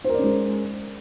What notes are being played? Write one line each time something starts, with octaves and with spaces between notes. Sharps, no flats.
G#3 C#4 A#4 C5 D5